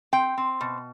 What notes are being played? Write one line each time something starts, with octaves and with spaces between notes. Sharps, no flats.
C4 G5
C4
B2